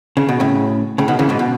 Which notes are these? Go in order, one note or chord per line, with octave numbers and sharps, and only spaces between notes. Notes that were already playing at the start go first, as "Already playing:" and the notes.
C#3
B2
A2 C#3
A2 C#3
B2 D#3
C#3 E3
G#2 B2
B2